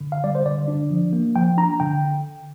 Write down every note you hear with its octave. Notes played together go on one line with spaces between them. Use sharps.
D3
F5
G3 D5
C5
D3 D5
D4
F3
A#3
F3 G5
D4 A#5
D3 G5